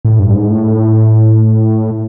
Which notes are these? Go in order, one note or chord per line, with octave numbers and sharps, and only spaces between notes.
A2
G2
G2
G#2
A2